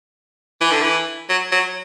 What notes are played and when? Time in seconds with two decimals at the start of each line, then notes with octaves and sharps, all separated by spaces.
0.61 E3
0.71 D3
0.82 E3
1.29 F#3
1.52 F#3